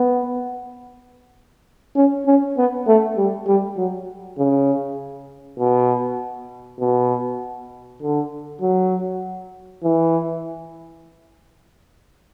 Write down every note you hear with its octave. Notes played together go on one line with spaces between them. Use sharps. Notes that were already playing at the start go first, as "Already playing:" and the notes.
Already playing: B3
C#4
C#4
B3
A3
G3
G3
F#3
C#3
B2
B2
D3
F#3
E3